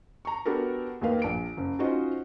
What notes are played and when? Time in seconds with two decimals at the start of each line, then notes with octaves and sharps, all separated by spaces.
0.25 A#5 C#6
0.46 B3 D4 F#4 G4 A4 A#4
1.01 D#2 D#3 A#3 B4 F5
1.22 A#1 D7
1.57 F#1
1.79 C#4 D#4 F4 F#4 C5 D#5